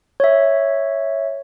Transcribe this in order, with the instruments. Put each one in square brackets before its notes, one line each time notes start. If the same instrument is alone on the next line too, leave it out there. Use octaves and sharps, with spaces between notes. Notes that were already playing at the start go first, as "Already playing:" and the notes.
[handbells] C#5 E5